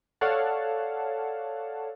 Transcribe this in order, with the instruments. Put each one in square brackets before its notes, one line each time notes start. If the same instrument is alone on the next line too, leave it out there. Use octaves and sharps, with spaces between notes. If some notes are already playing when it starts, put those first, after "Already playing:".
[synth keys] A4 C#5 D5 F5 F#5 A5